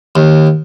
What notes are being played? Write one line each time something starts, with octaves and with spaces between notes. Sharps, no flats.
D#2